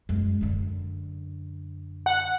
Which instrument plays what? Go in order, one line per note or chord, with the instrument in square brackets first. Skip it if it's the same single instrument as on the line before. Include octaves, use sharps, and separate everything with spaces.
[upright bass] F#2 G#3
F#2 D3
[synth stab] F#5